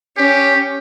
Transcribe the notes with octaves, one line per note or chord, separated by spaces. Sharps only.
C#4 G4